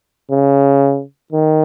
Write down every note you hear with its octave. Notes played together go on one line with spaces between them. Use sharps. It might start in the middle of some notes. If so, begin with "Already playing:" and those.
C#3
D#3